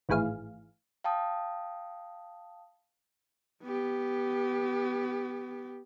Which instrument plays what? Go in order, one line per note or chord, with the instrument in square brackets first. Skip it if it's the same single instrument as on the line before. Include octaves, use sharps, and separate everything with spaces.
[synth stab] G#1 A2 E3 G#4 F5
[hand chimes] F5 G5 A5 D#6
[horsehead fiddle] B3 G4